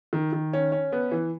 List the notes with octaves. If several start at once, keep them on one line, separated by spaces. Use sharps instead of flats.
D#3
D#3
C#4
C#4
B3
E3